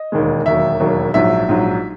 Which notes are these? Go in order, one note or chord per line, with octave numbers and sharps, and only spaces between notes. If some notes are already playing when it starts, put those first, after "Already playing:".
Already playing: D#5
E1 D#2 D#3 G#3
E1 D#2 D#3 F#3 E5
E1 D#2 D#3 F#3
A#1 G#2 F#3 E5
A#1 G#2 F#3